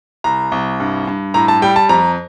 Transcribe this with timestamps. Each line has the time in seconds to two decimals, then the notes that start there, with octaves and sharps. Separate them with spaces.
0.24 C2 A#5
0.52 C2
0.80 G2
1.07 G2
1.34 A2 A#5
1.48 A5
1.62 G3 G5
1.76 A5
1.89 F2 A#5